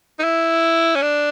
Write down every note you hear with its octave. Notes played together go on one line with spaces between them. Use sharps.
D#4
E4
C#4
D4